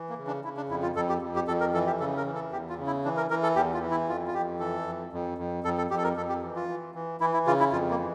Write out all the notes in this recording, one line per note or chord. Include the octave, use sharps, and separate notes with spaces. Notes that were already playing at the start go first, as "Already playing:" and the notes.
Already playing: E3
A#3
C#3
D4
C#3 E4
D4
F2 E4
F4
F2 A4
G4
F2
G4
F2 A4
A#4
E3 A4
G4
C#3 A4
A#4
E3
A4
E2 G4
F4
C#3
E4
E3 D4
A#4
E3 A#4
A4
E2 G4
F4
E3
E4
F2 F4
F4
F2 G4
E3 A4
F2
F2
F2
F2 A4
A4
F2 G4
A4
A#4
F2 A4
G4
E3
F4
E3
E3
E3 E4
E4
C#3 F4
E4
F2 F4
A#3
E3